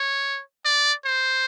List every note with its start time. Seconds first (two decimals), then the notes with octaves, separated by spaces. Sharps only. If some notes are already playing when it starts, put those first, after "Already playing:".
Already playing: C#5
0.65 D5
1.05 C5